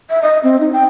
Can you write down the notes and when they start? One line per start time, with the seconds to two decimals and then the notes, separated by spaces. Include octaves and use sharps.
0.10 E5
0.22 D#5
0.44 C4
0.60 D#4
0.73 G5